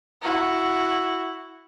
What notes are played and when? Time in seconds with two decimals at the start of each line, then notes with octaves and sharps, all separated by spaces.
0.22 E4 F#4